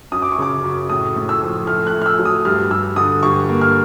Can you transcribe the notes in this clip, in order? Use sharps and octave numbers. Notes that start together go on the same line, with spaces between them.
F#2 D#6
D6
C#6
C#3 D6
F#2
A2 D#6
A2
E6
F3
A3 F6
F#6
A3
F6
E6
F#3
D#6
G2 F6
G2 E6
D3 D#6
G2 C#6
A#3
F6